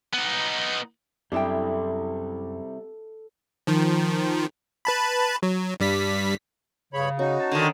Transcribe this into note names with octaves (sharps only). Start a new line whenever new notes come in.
B3 D#4
F#2 C3 G3 D4 E4 A4 G5
D#3 F3
B4 A5 B5
F#3
G2 G3 B6
G2 C#3 C#5 B5
C#4 D#4 F#4
A5
D3 D#3